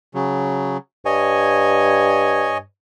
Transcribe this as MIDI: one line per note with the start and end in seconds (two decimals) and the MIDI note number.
0.14 0.77 49
0.14 0.77 54
1.05 2.63 43
1.05 2.58 73
1.05 2.58 75
1.05 2.58 80